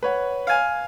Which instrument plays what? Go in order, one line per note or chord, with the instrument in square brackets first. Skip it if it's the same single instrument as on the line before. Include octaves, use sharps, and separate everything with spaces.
[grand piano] B4 C#5 F#5
[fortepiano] F5 G#5